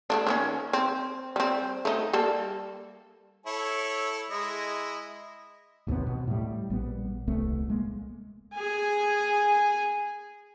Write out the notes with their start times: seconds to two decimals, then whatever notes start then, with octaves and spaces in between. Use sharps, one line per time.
0.10 A3 A#3 D4
0.27 D#3 A#3 C#4
0.73 C4
1.36 G3 C4
1.85 A3 D#4
2.13 G3 A#3 A4
3.46 E4 A4 C#5
4.30 G#3 E4 D#5
5.87 A1 D#2 C3 B3
6.07 B2
6.27 A2 G3
6.70 A#1 G3 B3
7.28 D#1 C2 A3 B3
7.70 G#3 A#3
8.55 G#4 G#5